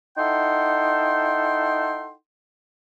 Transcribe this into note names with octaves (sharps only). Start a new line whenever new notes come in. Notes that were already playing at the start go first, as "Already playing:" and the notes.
D#4 E4 A4 F#5 G5 C6